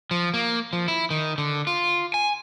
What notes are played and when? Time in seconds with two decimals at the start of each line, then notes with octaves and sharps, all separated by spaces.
0.11 F3
0.34 A#3
0.73 F3
0.88 E4
1.11 D#3
1.38 D3
1.67 F4
2.14 G#5